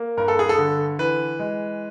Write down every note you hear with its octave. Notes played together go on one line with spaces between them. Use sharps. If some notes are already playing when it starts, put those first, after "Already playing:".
Already playing: A#3
G2 A#4
A4
G#4
A4
D3
E3 B4
G#3